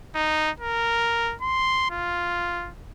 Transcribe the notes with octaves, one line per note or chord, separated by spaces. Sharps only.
D#4
A#4
C6
F4